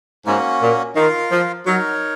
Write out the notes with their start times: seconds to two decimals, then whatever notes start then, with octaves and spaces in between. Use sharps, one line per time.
0.26 G#2 A#3 C#4 F#4
0.62 A#2
0.96 D#3 F4 A#4 F5
1.32 F3
1.66 F#3 D#4 A#4 C#5